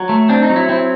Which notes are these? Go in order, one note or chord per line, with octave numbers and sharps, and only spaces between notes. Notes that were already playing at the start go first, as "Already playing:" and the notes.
Already playing: F#3
A3
C4 D4
D#4
F#3
E4
C4 E4